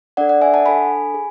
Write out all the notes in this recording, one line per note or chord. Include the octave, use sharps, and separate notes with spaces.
D4 A4 D5 F#5
D5 F#5
E5 G#5
F#5 A5
D4 A4 G#5 B5
G#4